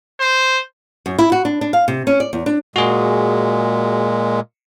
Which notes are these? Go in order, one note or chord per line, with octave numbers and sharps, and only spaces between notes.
C5
F#2
E4
F#4
D4
D4
F5
C3
C#4
D5
E2
D4
A#2 G#3 F#4 G#4